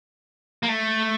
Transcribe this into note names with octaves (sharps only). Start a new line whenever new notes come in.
A#3
A3